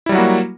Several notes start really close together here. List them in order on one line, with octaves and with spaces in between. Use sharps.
E4 G3 F#3 F#4 A#3